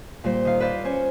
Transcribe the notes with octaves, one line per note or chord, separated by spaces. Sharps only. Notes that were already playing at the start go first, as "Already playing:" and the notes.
A#2 G3 C5
D#3 F5
B4 C5 D5 F5
C#4 C5 C#5